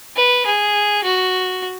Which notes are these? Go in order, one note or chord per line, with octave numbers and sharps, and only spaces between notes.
B4
G#4
F#4